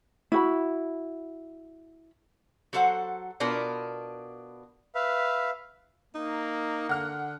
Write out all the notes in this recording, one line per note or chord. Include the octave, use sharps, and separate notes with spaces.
E4 F#4 B5
F#3 F#4 A4 C5 F#5
B2 D4 F4 A#4 B4
B4 E5 F5
A#3 D#4
D3 F#5 F6